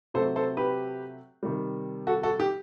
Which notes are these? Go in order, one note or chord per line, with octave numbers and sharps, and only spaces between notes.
C3 F#3 A3 C4 A4 C5
A4 C5
G4 B4
C3 D#3 G3
F#4 A4
F#4 A4
G4